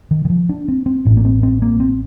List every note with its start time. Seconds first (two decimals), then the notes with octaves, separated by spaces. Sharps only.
0.11 D#3
0.25 D#3
0.30 F3
0.49 D4
0.68 C4
0.86 C4
1.05 A1 A2
1.17 A#3
1.25 C4
1.43 C4
1.62 A#3
1.80 C4